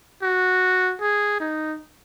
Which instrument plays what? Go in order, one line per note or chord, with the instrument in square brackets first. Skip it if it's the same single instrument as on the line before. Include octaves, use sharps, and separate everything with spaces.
[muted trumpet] F#4
G#4
D#4